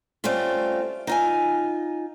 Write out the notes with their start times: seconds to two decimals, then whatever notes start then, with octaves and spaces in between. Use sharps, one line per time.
0.24 G3 A3 C4 C#4 F4
1.07 D#4 F4 G#5